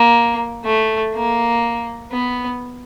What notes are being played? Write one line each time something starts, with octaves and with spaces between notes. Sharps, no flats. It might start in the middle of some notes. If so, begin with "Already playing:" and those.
Already playing: A#3
A3
A#3
B3